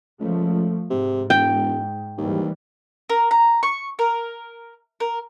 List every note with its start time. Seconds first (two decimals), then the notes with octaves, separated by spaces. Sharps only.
0.20 C#2 F3 A3
0.90 G#2 C3
1.30 E1 G5
2.17 D#2 G#2 E3 G3
3.10 A#4
3.31 A#5
3.63 C#6
3.99 A#4
5.00 A#4